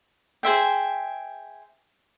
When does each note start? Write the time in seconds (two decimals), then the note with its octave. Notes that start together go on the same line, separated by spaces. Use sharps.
0.43 G#4 C5 E5 G5